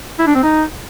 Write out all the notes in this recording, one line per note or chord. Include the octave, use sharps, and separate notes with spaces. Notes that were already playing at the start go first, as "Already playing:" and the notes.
E4
D4
C4
D#4